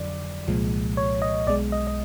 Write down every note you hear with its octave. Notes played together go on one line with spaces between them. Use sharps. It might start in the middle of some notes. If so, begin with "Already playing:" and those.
Already playing: F2 D3 F#3 D5
C2 A#2 F3 G#3
C#5
D#5
B1 B2 G#3 D5
D#5
D#5